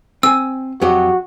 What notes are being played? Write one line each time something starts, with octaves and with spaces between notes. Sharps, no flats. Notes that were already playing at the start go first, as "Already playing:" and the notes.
C4 G#5 E6
F2 F#3 F#4 G4